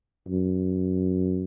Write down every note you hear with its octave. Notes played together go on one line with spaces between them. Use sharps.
F#2